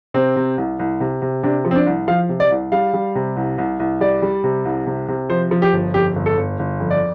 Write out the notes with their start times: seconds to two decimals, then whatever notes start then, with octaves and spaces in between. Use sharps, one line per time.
0.14 C3 C4
0.36 C3
0.58 C2
0.79 C2
1.00 C3
1.22 C3
1.43 C3 D4
1.65 F3
1.71 C4
1.75 D4
1.86 C2
2.08 F3 F5
2.29 C3
2.40 D5
2.51 C2
2.72 G3 F5
2.93 G3
3.15 C3
3.36 C2
3.58 C2
3.80 C2
4.01 G3 D5
4.22 G3
4.44 C3
4.65 C2
4.87 C3
5.08 C3
5.29 F3 C5
5.51 F3
5.62 G4
5.73 G1
5.94 F2 G4
6.16 G1
6.26 A4
6.37 G1
6.59 G1
6.80 F2
6.91 D5